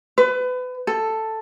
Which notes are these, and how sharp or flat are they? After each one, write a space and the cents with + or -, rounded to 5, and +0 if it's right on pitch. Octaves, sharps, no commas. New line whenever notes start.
B4 +30
A4 +5